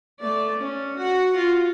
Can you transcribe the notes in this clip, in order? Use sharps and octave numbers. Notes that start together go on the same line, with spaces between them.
A3 D5
C#4
F#4 F#5
F4